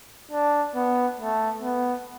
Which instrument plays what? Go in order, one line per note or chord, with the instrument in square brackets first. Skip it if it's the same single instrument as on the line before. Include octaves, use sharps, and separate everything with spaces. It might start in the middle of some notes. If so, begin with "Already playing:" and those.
[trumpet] D4
B3
A3
B3